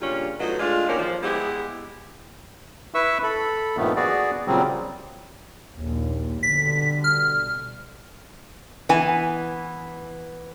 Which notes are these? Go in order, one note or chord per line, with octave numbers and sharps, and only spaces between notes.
A#2 C#3 G3 C#4 D4 F4
A2 F#3 B3 D#4 F4 D#5
G#3 A3 D4 F4
D#2 B2 C#4 G4 A#4 D5
F3
G#3 B3 E4 G4 G#4
E4 B4 E5 C#6 E6
A4 B5
G2 A#2 D#3 F3 A3 B3
B3 F#4 G#4 D5
A#2 C#3 F#3 G3 C4
A#1 D#2
B2 D3 G3 B6
F6
E3 B3 G#5